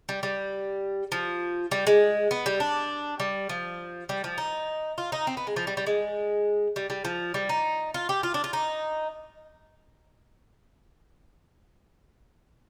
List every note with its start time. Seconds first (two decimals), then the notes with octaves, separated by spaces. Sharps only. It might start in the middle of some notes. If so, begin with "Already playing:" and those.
0.09 G3
0.23 G3
1.12 F3
1.71 G3
1.87 G#3
2.31 B3
2.46 G3
2.60 D4
3.20 G3
3.49 F3
4.09 G3
4.24 F3
4.38 D#4
4.98 F4
5.12 D#4
5.27 C4
5.37 B3
5.47 G#3
5.56 F3
5.67 G3
5.77 G3
5.86 G#3
6.76 G3
6.90 G3
7.05 F3
7.34 G3
7.49 D#4
7.94 F4
8.09 G4
8.23 F4
8.34 D4
8.44 F4
8.53 D#4